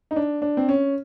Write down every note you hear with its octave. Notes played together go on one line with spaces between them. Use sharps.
D#4
D4
D4
C4
C#4